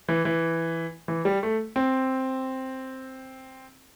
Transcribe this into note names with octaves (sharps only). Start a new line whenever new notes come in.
E3
E3
E3
G3
A3
C4